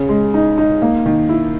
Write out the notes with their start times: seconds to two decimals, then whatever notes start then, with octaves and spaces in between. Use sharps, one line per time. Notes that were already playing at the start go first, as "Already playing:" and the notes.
Already playing: C#3
0.09 G#3
0.34 D#4
0.58 D#4
0.82 A#3
1.06 D#3
1.29 E4